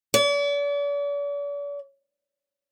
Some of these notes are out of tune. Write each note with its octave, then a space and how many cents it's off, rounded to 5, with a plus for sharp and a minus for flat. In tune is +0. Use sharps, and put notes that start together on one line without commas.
D5 -45